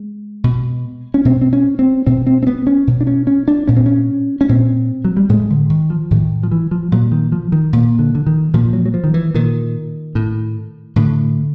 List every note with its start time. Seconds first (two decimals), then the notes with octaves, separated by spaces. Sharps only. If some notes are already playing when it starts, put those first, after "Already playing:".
Already playing: G#3
0.44 B2
1.14 C#4
1.25 B2 C4
1.42 C4
1.53 C#4
1.79 C4
2.07 B2 C4
2.27 C4
2.43 C4
2.47 B3
2.67 C#4
2.87 B2
3.01 D4
3.07 C#4
3.27 C#4
3.48 D4
3.68 A#2 C#4
3.76 C4
3.86 C#4
4.41 C#4
4.49 A#2 C4
5.05 F#3
5.17 G3
5.29 A2 G#3
5.50 D3
5.70 D#3
5.90 F3
6.11 A2 D#3
6.43 F3
6.52 E3
6.71 F3
6.92 A#2 F#3
7.12 D#3
7.32 F3
7.52 D#3
7.73 A#2
7.99 D3
8.15 D3
8.27 D#3
8.54 A#2 F3
8.73 F#3
8.86 F#3
8.94 F3
9.04 D#3
9.14 E3
9.35 A#2 D#3
10.15 A2
10.96 A2 D3